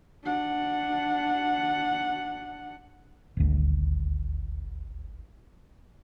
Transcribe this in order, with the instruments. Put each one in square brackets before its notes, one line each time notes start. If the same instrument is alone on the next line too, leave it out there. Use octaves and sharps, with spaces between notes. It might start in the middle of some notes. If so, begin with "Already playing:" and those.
[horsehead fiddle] D4 F#5
[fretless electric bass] D#1 G#1 D2